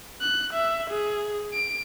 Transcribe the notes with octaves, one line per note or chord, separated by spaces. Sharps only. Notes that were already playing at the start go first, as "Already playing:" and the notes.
F#6
E5
G#4
D7